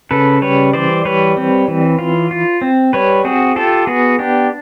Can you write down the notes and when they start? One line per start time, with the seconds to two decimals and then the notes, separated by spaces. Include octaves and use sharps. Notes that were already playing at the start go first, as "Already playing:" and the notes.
0.11 C#3 A4 B4
0.42 G3 B4 C#5
0.73 E3 C5 D5
1.05 G3 B4 C#5
1.37 C4
1.68 E3
1.99 F4
2.31 F4
2.61 C4
2.93 G3 B4 C#5
3.24 C4 F#4 G#4
3.56 F4 G4 A4
3.87 B3 F#4 G#4
4.19 D4 G4